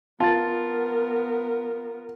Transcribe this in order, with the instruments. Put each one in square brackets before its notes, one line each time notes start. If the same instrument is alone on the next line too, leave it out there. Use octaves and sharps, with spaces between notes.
[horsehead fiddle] B3 A#4 [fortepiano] F4 [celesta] A5 A6